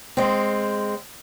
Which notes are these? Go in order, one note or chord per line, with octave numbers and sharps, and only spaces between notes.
G#3 C4